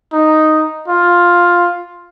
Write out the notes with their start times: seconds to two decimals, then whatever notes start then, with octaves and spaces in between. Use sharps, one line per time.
0.13 D#4
0.88 F4